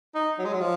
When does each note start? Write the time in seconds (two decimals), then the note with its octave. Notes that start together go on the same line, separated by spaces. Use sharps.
0.15 D#4
0.39 F#3
0.45 G#3
0.54 F#3
0.61 F3